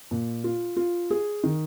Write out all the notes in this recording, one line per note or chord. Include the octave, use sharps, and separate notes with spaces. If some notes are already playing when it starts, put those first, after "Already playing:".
A#2
F4
F4
G#4
D#3